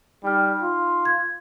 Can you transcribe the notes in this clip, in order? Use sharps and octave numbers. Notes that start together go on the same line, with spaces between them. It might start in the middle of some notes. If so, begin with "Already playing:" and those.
G3 D#4 F6
F4
G#6